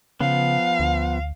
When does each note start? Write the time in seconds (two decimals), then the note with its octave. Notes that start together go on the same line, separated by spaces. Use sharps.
0.21 C#3 F3 B3 F5
0.80 D2